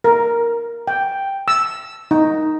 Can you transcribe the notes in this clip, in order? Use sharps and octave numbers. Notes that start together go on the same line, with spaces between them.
A#4
G5
E6
D#4